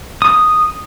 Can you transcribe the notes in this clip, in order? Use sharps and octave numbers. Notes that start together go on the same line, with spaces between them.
D#6